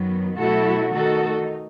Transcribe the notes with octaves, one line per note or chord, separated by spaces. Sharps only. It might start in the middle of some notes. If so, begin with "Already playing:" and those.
Already playing: F#2 D#3 F#3 B3
B2 F#3 A3 E4 F#4 A4
D#3 A3 D#4 F#4 A4